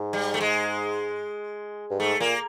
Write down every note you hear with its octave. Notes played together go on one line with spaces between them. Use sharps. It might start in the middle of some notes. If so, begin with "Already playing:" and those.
Already playing: G#2
G3
A3
G#3
G2
G#2 A3
A#2 A#3